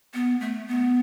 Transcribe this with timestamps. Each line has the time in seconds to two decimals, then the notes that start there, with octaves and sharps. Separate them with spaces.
0.14 B3
0.41 A3
0.68 B3